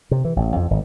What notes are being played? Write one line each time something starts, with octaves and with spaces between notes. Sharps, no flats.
C3
E3
A1
F2
G#1